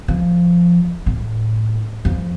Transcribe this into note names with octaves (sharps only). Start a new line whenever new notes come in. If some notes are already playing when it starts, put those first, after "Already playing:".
F3
A2
F2